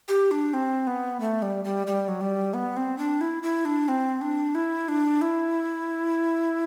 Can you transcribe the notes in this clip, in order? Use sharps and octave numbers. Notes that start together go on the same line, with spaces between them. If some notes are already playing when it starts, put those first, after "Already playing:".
G4
D4
C4
B3
A3
G3
G3
G3
F#3
G3
B3
C4
D4
E4
E4
D4
C4
D4
E4
D4
E4